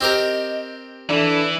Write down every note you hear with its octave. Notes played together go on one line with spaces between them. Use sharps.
C4 G4 A#4 D#5
E3 D4 E4 A4 D5